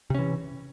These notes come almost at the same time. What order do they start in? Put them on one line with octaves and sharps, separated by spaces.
C3 C#4 E3